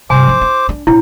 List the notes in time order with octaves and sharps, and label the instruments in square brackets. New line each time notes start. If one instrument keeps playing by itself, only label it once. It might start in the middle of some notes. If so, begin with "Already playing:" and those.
[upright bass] G2 C3 [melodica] C5 D6 [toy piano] G#5
[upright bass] F3 D#4
E4
D4
[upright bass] A#1 D4 [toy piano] E4